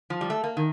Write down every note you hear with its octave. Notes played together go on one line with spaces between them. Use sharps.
F3
G3
A3
A#3
D#3